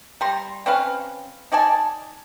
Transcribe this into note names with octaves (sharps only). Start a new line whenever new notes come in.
G3 A#5 C6
C4 C#4 B4 F5
D#4 D5 G#5 A5